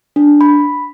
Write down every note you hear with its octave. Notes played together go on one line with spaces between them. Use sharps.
D4
B5